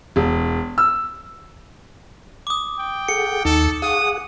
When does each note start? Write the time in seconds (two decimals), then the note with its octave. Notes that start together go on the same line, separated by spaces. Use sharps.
0.16 E1
0.78 E6
2.47 D6 D#6
2.79 G5
3.08 G#4 A4 F#5 C#7
3.45 D#2 D#4 A4
3.82 G#4 F5 F#5 C#6 D#6